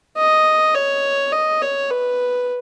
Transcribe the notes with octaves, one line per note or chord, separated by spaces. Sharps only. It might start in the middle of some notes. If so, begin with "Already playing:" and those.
D#5
C#5
D#5
C#5
B4